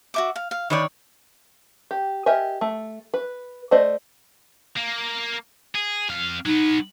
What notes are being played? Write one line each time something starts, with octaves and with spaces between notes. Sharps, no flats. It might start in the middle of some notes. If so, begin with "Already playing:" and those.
F#4 E5 D6
F5
F5
D#3 B4 C#5 D5 G5
G4
G4 A#4 D#5 E5 G#5
A3
B4
A3 C5 D5 D#5
A#3
G#4
F2 F5
F#3 B3 D#4